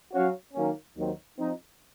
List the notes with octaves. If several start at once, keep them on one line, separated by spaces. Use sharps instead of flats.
F#3 C#4 F#4 C#5 F5
D#3 F#3 A#3 C#4
D#2 D#3 F#3 C4
F3 C4 D#4